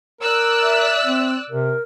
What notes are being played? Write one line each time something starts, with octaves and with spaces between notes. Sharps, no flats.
A#4 D5 E6 F#6
E5
C4
C3 A#4